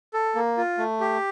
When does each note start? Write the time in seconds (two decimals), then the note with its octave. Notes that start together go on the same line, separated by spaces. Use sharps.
0.14 A4
0.35 A#3
0.57 F4
0.78 A3
1.00 G4